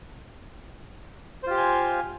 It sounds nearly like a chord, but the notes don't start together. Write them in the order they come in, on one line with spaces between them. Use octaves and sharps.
C5 F4 G4 F5 G#5